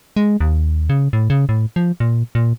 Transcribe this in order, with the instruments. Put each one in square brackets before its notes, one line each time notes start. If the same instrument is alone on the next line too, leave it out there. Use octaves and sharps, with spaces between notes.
[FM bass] G#3
D#2
C#3
A2
C#3
A2
F3
A#2
A#2